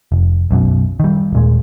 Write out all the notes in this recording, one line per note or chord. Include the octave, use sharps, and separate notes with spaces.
F1
B1 F#2 B2
D#3 G3
D#1 A#2 G#3